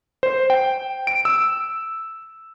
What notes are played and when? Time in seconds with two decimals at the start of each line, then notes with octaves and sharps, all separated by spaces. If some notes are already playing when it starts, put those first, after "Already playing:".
0.23 C5
0.50 G5
1.07 D7
1.25 E6